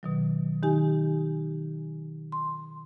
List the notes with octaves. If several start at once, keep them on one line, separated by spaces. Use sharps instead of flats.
B2 D#3 F#3
D#3 D#4 G4 G#5
C6